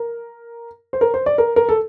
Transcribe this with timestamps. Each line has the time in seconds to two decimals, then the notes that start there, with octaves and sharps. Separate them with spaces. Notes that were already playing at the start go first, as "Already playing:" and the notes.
Already playing: A#4
0.93 C5
1.01 A#4
1.14 C5
1.26 D5
1.38 A#4
1.56 A#4
1.69 A4